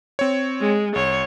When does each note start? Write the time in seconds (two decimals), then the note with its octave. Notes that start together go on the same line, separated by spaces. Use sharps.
0.19 C4 C#5
0.61 G#3
0.96 C2 C#5